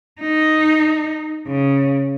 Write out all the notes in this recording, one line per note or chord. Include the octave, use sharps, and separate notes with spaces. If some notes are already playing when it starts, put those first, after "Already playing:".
D#4
C#3